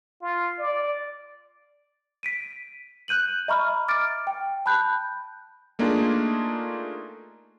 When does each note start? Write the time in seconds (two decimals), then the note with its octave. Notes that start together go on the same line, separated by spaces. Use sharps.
0.22 F4
0.59 D5
2.23 B6 D7 D#7
3.08 F#6 G6 D#7 F#7
3.48 D#5 E5 A#5 B5 C#6 F6
3.88 D6 F6 A6 D7
4.27 G5
4.66 A5 B5 F#6 G6
5.79 A3 A#3 D4 D#4 F4 G#4